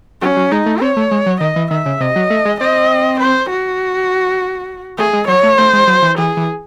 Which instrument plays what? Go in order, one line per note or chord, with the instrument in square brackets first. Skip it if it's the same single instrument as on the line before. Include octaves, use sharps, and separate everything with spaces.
[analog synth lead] F#3 [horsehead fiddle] C#4
[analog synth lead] F#3
[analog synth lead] G#3 [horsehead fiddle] D#4
[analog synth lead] A3
[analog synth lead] C4 [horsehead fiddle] C#5
[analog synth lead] A3
G#3
F#3
[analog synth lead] D#3 [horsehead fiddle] D#5
[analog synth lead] E3
[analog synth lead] D#3 [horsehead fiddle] E5
[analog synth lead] C#3
[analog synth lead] C3 [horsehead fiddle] D#5
[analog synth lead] F#3
A3
G#3
[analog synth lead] C4 [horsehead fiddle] D#5
[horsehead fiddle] C5
F#4
[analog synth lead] A3 [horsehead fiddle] G#4
[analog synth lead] G#3
[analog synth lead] F#3 [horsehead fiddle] C#5
[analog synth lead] A3
[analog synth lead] A3 [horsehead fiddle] C5
[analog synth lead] G#3
F#3
E3
[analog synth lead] E3 [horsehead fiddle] G#4
[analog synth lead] E3